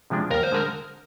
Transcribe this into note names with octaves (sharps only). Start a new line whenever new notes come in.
C3 F3 G#3 D4
D#2 A#4
C5
D3 G#3 A#4